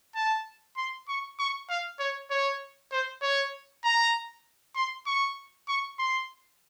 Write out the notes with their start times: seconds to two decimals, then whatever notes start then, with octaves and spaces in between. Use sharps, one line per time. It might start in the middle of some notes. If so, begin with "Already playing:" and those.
0.16 A5
0.77 C6
1.08 C#6
1.39 C#6
1.69 F5
1.99 C#5
2.31 C#5
2.92 C5
3.22 C#5
3.84 A#5
4.76 C6
5.06 C#6
5.68 C#6
5.99 C6